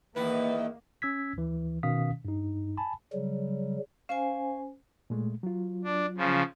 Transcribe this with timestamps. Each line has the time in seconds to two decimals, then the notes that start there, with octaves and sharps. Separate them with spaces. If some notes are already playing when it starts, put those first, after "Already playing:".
0.16 E2 D#3 A#3 E4 B4
1.02 C#4 E6 G#6 B6
1.37 D2 E3
1.83 B2 D#3 C#4 F5 D#6 B6
2.25 G2 D#4
2.77 G#5 A5 B5
3.13 C#3 F#3 G3
4.09 C#4 C5 F5 G#5
5.10 A#2 G#3 A3
5.43 F#3 F4
5.84 D4
6.17 C#3 F3